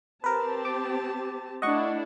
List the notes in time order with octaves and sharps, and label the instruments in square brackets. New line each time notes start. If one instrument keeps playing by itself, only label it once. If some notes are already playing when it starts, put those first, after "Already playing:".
[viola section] C4 G4 A5 [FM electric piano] A#4 B4
[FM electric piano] D6
[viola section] A3 D4 E4 [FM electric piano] D#5 F#5 C#6